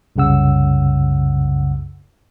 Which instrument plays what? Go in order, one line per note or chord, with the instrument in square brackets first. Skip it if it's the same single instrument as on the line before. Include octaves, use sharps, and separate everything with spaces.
[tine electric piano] C2 F#2 C#3 F#5 E6